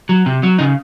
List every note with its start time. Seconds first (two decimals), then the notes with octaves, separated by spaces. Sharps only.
0.09 F#3
0.26 C3
0.43 F#3
0.59 C#3 D#4